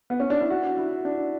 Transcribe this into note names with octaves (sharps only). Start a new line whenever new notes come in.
B3
C#4
D4
E4
F#4
E4
D4